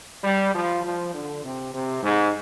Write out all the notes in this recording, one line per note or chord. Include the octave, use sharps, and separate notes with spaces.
G3
F3
F3
D3
C3
C3
G#2